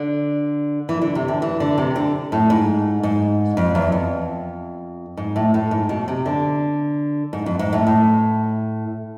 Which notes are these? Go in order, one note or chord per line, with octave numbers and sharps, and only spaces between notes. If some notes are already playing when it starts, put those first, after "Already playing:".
Already playing: D3
E3
D3
C3
D3
E3
D3
C3
D3
A2
G#2
G#2
F2
E2
F2
G#2
A2
A2
G#2
B2
C3
D3
G#2
F2
G#2
A2
A2